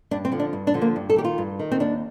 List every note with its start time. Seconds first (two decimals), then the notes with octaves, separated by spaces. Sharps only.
0.11 G2 D4
0.25 C4
0.32 D3 F3
0.40 D4
0.53 G2
0.67 D4
0.74 D3 F3
0.82 A#3
0.96 G2
1.10 A4
1.16 D#3 G4
1.24 F4
1.38 G2
1.59 D#3
1.72 C4
1.80 D#2 D4